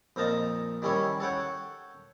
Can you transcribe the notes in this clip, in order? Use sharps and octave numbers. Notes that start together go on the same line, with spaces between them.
F2 A#2 D#4 F5 A5 A#5
D#3 G3 C#4 E4 C#5
A4 C#5 F#5 G5